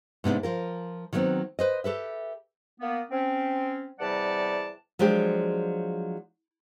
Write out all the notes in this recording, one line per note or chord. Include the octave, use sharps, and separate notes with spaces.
G#2 C3 B3 D4
F3 F4 A#4
D#3 F#3 A3 B3 C4
B4 C5 D#5
G4 A4 B4 E5
A#3 B3
C4 C#4
E2 C3 G3 D5 F#5 A5
F3 F#3 G#3 D4 G4